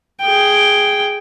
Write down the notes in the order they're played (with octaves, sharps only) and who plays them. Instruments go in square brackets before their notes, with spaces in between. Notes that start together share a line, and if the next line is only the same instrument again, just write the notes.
[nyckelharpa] G#4 G5